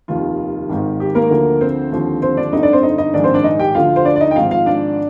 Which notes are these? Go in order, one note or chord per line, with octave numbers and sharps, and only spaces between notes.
F1 D#2 D#3 F4
G#1 G#2 D#3
G4
A#3 A#4
D2 D3 F3
C4 C5
D#2 D3 F3
C4 C5
D4 D5
G1 F2 D3 D#4 D#5
D4 D5
C4 C5
D#4 D#5
D#4 D#5
A#1 G#2 D#3 D4 D5
C4 C5
D4 D5
D#4 D#5
G4 G5
D2 D3 F3 F4 F5
C5
D4 D5
D5
D#4 D#5
G5
G#1 G#2 F3 F4 F5
F4 F5
D4 D5